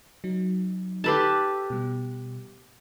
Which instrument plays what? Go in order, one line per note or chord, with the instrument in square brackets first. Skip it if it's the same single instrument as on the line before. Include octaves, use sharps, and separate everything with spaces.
[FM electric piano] F#3 D#4
[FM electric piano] D#4 A4 E6 [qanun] G4 B4 A5
[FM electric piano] B2 G3